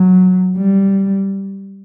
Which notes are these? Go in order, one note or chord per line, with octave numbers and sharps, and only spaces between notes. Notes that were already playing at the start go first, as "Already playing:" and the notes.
Already playing: F#3
G3